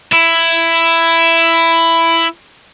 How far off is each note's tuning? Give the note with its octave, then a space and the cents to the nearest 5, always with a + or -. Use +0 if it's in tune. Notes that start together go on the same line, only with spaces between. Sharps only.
E4 +10